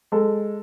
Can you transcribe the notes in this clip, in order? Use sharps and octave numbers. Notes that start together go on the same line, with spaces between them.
G#3 A4